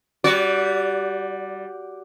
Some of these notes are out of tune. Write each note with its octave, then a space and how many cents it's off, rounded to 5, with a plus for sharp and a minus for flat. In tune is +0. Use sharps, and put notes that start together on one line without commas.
G3 +0 F#4 +0 D5 -30